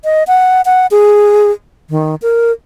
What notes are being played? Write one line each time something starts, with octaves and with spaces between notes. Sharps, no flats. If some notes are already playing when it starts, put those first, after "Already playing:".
D#5
F#5
F#5
G#4
D#3
A#4